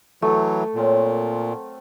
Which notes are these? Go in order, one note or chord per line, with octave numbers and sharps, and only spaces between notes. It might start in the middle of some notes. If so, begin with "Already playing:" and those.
E3 F#3 A3
A#2 F#3 C4 A#4